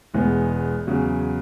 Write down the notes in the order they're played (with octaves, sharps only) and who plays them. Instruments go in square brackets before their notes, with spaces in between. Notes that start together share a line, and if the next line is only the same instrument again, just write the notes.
[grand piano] E1 E2 E3 G#3 B3
E2 C#3 F#3